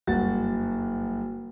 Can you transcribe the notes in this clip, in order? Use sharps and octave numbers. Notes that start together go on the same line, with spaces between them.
F#1 G2 F#4 A6